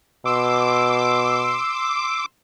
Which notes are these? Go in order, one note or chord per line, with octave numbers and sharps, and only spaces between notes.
B2 C6 D6 E6